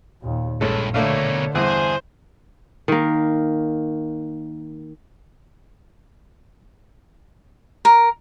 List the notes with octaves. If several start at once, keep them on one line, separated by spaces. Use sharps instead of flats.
D#2 A#2
A#1 G2 G#3 C#4 E4 A4
B2 D3 A3 A#3 D4 C#5 F5
E2 G2 G#4 C5 G#5
D#3 A#3
A#4